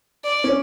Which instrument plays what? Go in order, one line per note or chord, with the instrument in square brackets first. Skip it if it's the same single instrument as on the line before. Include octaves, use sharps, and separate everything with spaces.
[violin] D5
[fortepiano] C#4